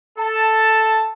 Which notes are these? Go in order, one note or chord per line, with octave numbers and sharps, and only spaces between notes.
A4 A5